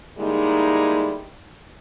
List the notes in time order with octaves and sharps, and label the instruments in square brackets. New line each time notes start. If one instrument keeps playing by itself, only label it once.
[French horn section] D3 G3 G#3 A#3 D#4 E4